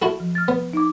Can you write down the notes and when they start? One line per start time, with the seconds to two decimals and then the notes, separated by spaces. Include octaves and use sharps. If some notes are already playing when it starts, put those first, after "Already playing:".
0.02 E4 F#4 A4
0.20 F3
0.35 F6 A6
0.48 B3
0.73 D#4 D6